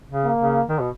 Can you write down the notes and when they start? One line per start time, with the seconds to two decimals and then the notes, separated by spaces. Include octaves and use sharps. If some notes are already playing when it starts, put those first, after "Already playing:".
0.11 C#3
0.25 A#3
0.40 C#3
0.69 D#3
0.81 B2